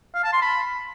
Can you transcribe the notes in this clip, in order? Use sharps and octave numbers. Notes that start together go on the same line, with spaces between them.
F5
A5
C6
B5